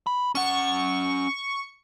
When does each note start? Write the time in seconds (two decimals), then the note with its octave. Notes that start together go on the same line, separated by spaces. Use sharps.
0.07 B5
0.35 C#4 F#5 C#6